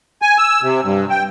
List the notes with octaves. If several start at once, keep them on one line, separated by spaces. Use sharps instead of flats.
G#5
E6
C3
G2
G5